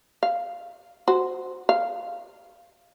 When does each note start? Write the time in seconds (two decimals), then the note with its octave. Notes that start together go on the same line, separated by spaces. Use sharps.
0.23 F5
1.07 F#4 C5
1.69 F5